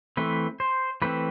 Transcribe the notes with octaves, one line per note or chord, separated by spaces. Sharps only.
E3 A3 C4 B4
C5
E3 A3 C4 B4